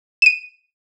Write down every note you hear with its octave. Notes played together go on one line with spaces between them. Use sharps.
D#7 E7